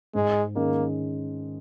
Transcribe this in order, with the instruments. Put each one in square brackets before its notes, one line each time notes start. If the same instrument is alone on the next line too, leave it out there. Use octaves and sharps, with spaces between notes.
[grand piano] G#2 [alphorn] G#3
[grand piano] D#3 G#3 C#4 [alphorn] A#3